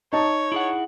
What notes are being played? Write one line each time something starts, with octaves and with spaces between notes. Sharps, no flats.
D#4 C#5 A5
E4 G#4 F#5